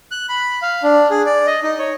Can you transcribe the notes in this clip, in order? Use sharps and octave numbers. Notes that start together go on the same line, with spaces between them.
F#6
B5
F5
D4
G#4
D5
D#5
D#4
C#5